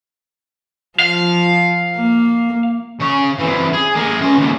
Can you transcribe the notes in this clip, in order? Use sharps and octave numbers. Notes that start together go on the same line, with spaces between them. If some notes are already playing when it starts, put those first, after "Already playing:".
F3 F5
A#3
C#3 C#5
E3 C4
G#4
A#3 G#4
C#4 C6
D#2 C#3